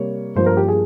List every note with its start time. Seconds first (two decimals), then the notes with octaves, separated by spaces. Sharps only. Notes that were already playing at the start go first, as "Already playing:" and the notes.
Already playing: C3 G3 A#3 C#5
0.35 G2 F3 A#3 C5
0.46 A#4
0.57 G4
0.68 G#4